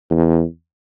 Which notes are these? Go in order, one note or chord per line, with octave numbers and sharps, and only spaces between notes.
E2